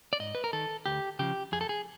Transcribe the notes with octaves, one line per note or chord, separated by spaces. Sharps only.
D5
G#2 D#5
B4
A#4
D#3 A4
D2 G4
C#3 F3 G4
F2 G#4
A4
G#4